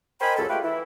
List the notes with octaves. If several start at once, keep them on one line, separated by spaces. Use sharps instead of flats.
A#4 C5 D#5 G5 G#5 B5
C#2 F#2 A4
G#3 A3 F4 G4 B4 G5
E3 E4